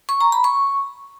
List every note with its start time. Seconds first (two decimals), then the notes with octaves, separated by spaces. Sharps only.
0.09 C#6
0.21 A#5
0.32 B5
0.44 C#6